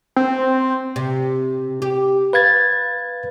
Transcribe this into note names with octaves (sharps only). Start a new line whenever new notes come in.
C4
C3
G4
B4 F5 G#6 A6